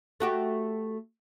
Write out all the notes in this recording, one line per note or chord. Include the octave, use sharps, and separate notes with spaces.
A3 F#4 G4